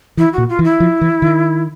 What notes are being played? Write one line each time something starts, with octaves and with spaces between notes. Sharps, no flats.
E3 E4
A#2 F#4
F4
E3
E4
F3
E3
D#3